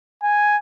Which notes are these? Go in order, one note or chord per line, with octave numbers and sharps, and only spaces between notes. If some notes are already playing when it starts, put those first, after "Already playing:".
G#5